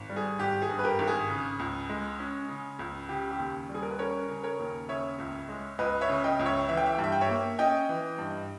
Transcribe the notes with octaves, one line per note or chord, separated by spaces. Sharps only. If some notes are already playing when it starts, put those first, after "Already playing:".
Already playing: G#1
G3
G#4
G#1 G4
G#4
G2
B4
G4 A#4
G#1
G#4
C#3
C#2
G#3
C#4
C#3
C#2
C#3 G4
G4
D#2
G3
G#4
A#4
B4
C#4 A#4 C#5
C#3
A#4 C#5
D#2
C#3 C#5 E5
C#2
G#3
C#2 B4 D#5
C#5 E5
C#3
D#5 G5
C#2
C#5 E5
E3 E5
G5
E5
G5
G2
E5
G5
C#5 E5
A#3
C#4 D#5 G5
E3
G2